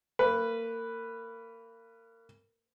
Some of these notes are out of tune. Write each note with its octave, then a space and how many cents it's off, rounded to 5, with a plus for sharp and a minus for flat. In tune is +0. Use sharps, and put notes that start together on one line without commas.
A#3 -30 B4 +0